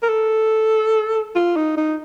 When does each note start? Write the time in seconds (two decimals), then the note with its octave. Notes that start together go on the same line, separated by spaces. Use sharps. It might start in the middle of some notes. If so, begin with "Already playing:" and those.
0.03 A#4
0.09 A4
1.35 F4
1.56 D#4
1.77 D#4